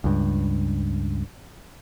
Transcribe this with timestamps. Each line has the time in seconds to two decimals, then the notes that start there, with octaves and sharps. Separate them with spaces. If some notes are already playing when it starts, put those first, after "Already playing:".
0.04 C#2 G2